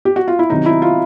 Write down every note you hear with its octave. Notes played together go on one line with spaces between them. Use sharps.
G4
F#4
F4
E4
C3 D#3 F#3 D#4
E4
F4